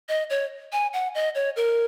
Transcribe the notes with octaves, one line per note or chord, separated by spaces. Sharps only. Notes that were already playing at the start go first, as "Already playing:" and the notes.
D#5
C#5
G#5
F#5
D#5
C#5
A#4